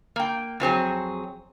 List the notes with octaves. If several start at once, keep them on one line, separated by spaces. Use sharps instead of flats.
A#3 G5
F2 F#3 C4 G#4